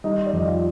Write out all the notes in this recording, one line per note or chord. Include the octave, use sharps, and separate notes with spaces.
G3 D#4 D#5
D5
F2 D#5
F4 F5